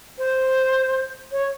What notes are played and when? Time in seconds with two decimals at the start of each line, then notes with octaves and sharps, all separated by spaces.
0.18 C5
1.32 C#5